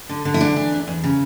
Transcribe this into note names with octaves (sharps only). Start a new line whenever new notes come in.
D3
D3
E4
E2 D4
E3
E2
E2
C#3